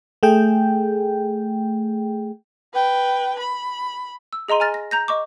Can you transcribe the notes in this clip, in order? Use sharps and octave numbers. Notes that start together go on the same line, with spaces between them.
A3 G#4 G5
B4 G5
B5
E6
G#4 D#5 A#5 C6 D#7
G#5 A#5 F6 A6 A#6
A#6
A#5 G6 A#6
D#5 C#6 D6